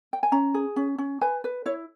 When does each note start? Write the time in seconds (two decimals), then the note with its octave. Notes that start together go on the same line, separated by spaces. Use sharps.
0.13 G5
0.23 G#5
0.32 C#4 A#5
0.54 G#4
0.76 C#4
0.98 C#4
1.21 B4 G#5
1.44 B4
1.66 E4 C#5